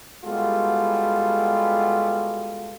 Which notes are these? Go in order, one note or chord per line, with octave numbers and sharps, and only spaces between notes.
G3 G#3 B3 F4 F#4 A4